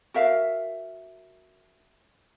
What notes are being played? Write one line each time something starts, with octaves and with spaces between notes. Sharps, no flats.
F#4 A#4 E5 F5